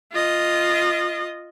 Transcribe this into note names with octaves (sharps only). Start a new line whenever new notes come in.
F4 D#5